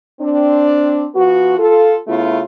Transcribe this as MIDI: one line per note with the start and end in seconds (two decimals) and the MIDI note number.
0.20 1.05 60
0.20 1.05 62
1.15 1.55 53
1.15 1.55 59
1.15 1.55 66
1.58 1.96 65
1.58 1.96 69
2.07 2.41 49
2.07 2.41 57
2.07 2.41 59
2.07 2.41 64
2.07 2.41 65